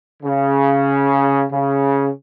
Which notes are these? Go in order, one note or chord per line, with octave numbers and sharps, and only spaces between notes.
C#3
C#3